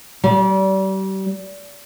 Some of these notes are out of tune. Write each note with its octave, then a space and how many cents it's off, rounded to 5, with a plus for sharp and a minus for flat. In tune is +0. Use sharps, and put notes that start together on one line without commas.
G3 -35